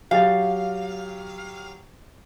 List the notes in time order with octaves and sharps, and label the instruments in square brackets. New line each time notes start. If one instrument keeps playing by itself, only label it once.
[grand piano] F#3 G4 A6 [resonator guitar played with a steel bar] F5